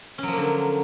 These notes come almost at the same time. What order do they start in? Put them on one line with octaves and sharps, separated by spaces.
C#4 F#3 F3 A#3 D3